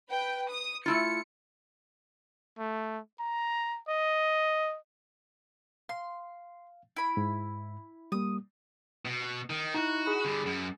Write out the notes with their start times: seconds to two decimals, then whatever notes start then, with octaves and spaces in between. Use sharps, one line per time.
0.11 B4 G5
0.50 D#6
0.86 A3 E4 F4 C#7
2.58 A3
3.19 A#5
3.88 D#5
5.89 F5 C6
6.96 E4 B5
7.17 G#2
8.12 G3 A#3 D#6
9.05 B2
9.50 D#3
9.74 D#4 E4 F#4
10.07 G#4 B5
10.25 D3 G3
10.46 F#2